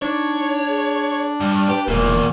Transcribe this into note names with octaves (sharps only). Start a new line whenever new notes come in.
D4 D#4 C#5
G#4
G2
G4 B4
E1 E2 A#2 A#4